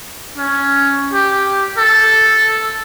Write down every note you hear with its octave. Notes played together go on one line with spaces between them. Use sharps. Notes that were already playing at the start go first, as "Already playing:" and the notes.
C#4
G4
A4